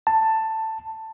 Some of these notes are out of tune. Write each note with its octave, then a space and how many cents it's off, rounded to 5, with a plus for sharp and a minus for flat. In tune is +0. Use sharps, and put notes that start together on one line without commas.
A5 +10